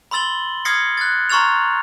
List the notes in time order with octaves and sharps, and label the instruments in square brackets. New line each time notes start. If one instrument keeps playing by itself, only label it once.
[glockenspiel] B5 C6 E6 A6 F#7 G7
D#6 F6 G#6 A#6 C7 C#7
F#6 A6
A#5 C6 C#6 F6 A6 F7